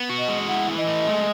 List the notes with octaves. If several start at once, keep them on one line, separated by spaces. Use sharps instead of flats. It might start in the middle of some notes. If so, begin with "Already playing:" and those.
Already playing: B3
F#4
D#5
G#3
E4 F#5
E3
D#5
A3
G#3